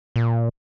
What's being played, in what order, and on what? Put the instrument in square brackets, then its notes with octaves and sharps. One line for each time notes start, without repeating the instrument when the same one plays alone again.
[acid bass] A#2